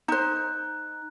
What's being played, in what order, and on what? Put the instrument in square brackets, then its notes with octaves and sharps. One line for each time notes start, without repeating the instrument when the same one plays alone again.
[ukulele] D#4 C5 [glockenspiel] A#5 F#6